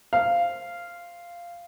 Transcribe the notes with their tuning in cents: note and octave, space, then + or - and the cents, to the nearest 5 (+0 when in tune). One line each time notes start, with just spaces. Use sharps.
C5 +10 F5 -10